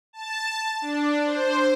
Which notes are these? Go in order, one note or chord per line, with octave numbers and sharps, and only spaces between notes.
A5
D4
C5